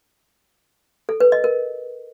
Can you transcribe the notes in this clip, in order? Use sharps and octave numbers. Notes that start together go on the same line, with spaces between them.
A4
B4
D#5
A#4